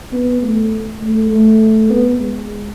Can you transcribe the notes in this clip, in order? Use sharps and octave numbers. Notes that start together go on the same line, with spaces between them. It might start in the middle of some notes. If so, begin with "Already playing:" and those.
B3
A3
A3
A3
B3
G#3